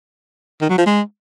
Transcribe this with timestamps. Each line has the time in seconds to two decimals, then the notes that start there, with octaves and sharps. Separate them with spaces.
0.61 D#3
0.70 F#3
0.78 F3
0.86 G#3